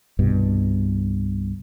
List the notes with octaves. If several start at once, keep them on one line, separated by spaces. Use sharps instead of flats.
C2 G2 B2